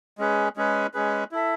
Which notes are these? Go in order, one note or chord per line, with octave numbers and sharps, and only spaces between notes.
G#3 C#4 G#4 B4
G#3 C#4 G#4 B4
G#3 C#4 G#4 B4
E4 A4 E5